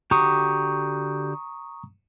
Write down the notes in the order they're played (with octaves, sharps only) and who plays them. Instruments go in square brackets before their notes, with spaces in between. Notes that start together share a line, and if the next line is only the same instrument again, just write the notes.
[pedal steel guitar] D3 F#4 G4 [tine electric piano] A#5 C#6 D#6